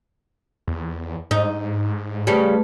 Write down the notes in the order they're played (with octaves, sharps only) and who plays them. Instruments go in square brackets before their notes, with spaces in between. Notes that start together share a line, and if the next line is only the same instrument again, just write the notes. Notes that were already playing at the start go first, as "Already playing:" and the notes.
[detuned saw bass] E2
[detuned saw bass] G#2 [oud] D#4
[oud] C#3 G3 [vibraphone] A3 B4 A5